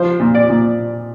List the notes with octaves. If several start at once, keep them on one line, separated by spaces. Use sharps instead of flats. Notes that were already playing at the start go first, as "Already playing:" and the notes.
Already playing: F3 C5
A#2
D5
A#2